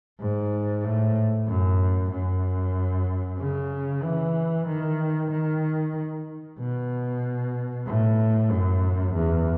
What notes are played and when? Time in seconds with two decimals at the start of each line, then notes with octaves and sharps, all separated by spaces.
0.20 G#2
0.85 A2
1.48 F#2
2.11 F#2
3.40 C#3
4.03 E3
4.68 D#3
5.31 D#3
6.59 B2
7.87 A2
8.51 F#2
9.14 E2